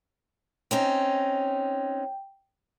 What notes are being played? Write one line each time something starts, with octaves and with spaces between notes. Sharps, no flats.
C4 C#4 D#4 G5